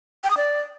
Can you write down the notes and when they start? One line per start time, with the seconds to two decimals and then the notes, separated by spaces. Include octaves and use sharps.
0.24 G5
0.31 D#6
0.37 D5